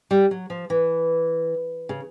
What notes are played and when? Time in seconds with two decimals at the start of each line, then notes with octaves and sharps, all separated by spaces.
0.11 G3
0.31 F#3
0.50 F3
0.70 E3
1.89 C#3